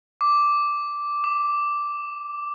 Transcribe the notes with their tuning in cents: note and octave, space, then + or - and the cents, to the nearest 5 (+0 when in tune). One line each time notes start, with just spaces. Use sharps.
D6 -5
D6 +30